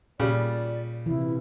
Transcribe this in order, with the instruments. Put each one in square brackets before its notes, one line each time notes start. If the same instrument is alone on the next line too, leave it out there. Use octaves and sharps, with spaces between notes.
[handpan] A#2 [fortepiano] C#3 G3 [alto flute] D5
[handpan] C3 E3 [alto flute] E4